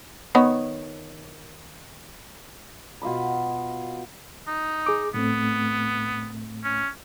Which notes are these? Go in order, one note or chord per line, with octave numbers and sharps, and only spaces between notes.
D#3 B3 C#5
B2 F4 D#5 B5
D#4
G#4 D6
A2 A3 B3 C4
C#4